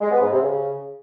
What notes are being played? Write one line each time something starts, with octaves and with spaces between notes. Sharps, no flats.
G#3
B3
G#2
C3
C#3